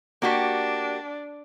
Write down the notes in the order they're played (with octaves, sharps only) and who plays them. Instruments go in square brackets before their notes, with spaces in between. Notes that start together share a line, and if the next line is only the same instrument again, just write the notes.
[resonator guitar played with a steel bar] A#3 F#4 G4 [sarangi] D4